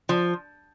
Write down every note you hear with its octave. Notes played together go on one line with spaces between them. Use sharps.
F3